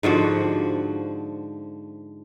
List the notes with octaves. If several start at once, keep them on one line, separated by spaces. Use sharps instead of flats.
G#2 D3 F3 F#4